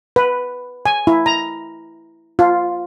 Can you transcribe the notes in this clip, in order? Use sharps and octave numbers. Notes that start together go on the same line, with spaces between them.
B4
G#5
E4
A#5
F4